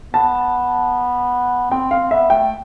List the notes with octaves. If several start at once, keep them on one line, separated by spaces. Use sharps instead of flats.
B3 A5
C4 G5
C4 F5
B3 E5
A3 G5